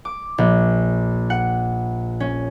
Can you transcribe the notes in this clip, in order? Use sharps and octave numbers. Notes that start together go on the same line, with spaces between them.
D6
A#1
F#5
C#4